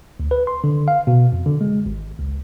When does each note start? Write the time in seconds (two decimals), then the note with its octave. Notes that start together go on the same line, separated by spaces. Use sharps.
0.20 D2
0.31 B4
0.47 C6
0.64 D3
0.88 F5
1.07 B2
1.32 F2
1.46 D3
1.61 G#3
1.86 G#1
2.19 C#2